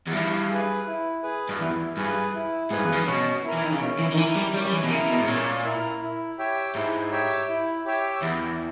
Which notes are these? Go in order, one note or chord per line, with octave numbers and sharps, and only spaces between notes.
E2
G2 E4
G#4 B4
E4
G#4 B4
G2
E2 E4
G2 G#4 B4
E4
G#2 G#4 B4
G2
E2
G2
B2 C#4
E4 A#4
E3
D#3
C#3
B2 C#4
E3
D#3
E3 E4 A#4
G3
G3 C#4
G3
E3
B2
C#3 E4 A#4
B2
G#2
A#2 C#4
E4 A#4
E4
G4 C#5 E5 G5
G#2 E4
G4 C#5 E5 G5
E4
G4 C#5 E5 G5
E2 E4